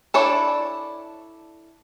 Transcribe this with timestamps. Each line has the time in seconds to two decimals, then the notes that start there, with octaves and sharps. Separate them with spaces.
0.14 D4 E4 A4 C#5 D5